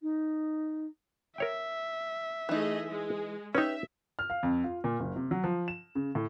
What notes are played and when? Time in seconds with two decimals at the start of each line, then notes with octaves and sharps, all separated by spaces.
0.01 D#4
1.38 A#4 C#5 E5 G5
2.49 E3 A3 D#4 G#4 D#5
2.88 G#3
3.55 C#4 D#4 G4 B4 E5
4.19 F6
4.30 F5
4.43 F2
4.64 F4
4.84 A#2
5.00 F#1
5.16 C3
5.31 F#3
5.44 F3
5.68 E7
5.95 C#3
6.15 A2